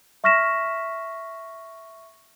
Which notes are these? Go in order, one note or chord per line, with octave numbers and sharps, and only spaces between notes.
E5 C#6 F6 A#6 B6 E7